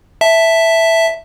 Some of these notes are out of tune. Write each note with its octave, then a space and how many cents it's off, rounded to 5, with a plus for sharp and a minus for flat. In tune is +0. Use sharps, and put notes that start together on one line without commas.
E5 +0 A5 +0